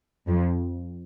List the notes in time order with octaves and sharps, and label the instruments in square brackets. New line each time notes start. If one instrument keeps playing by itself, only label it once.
[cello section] F2